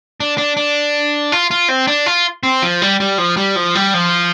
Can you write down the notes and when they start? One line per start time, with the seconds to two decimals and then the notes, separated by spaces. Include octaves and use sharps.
0.20 D4
0.38 D4
0.57 D4
1.32 F4
1.51 F4
1.69 C4
1.87 D4
2.06 F4
2.43 C4
2.63 F3
2.82 G3
3.00 G3
3.18 F3
3.37 G3
3.56 F3
3.75 G3
3.94 F3